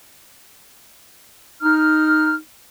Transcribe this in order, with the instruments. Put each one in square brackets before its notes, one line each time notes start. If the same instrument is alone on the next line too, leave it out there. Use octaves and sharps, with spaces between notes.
[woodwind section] D#4 F6